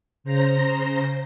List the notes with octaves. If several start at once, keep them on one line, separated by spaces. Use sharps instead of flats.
C#3 C5 A#5 A#6